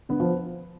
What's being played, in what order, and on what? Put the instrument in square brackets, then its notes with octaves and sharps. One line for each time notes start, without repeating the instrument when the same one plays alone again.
[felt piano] D3 [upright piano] B3
[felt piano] F3